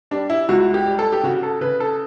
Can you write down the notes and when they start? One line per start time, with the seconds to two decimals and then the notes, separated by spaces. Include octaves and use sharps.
0.11 G3 D4
0.30 E4
0.49 C#2 F#4
0.74 G4
0.86 G3
0.99 A4
1.13 G4
1.23 C#3 F#4
1.43 A4
1.61 C#3 B4
1.80 A4